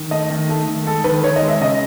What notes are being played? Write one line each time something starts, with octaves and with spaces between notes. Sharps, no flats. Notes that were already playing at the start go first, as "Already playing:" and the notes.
Already playing: D#3
A3 D#5
D#3
A3
D#3
G#3 A4
D#3 B4
D#3 C#5
D#5
G#3
E5
C#3 D#5